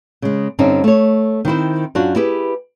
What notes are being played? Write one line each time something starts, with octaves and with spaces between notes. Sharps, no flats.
C#3 G#3
G2 D3 C4 C#4 D#4
A3 C#5
D#3 C4 E4 C5
F#2 D4 F4 F#4
E4 G4 G#4 B4